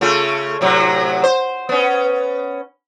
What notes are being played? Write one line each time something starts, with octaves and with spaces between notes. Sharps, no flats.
C#3 A3 F4
A2 C3 F#3
C5
B3 C#4